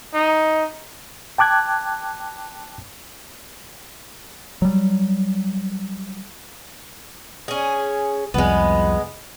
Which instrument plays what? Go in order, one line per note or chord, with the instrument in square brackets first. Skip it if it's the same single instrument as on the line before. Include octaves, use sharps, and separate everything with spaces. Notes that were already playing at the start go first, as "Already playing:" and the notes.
[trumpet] D#4
[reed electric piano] G5 A5 D6 F#6 G#6
[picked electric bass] F#3 G3
[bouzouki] C#4 G#4
[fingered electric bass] C2 F2 [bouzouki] G#3 B3